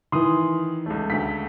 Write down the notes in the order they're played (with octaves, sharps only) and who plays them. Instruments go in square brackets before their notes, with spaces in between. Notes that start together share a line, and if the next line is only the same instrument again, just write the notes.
[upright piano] D#3 E3 [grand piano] C6 D#6
[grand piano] C#2 A3
[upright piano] D2 B6